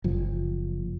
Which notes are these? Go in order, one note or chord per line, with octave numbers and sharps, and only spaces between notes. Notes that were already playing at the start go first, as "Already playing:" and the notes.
F#1 F3